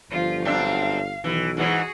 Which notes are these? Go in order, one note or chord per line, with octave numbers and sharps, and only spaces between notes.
G1 F3 F4
F#2 C4 D4 F5
B1 D#3 E3
G#2 E3 F#4 G#4 C#5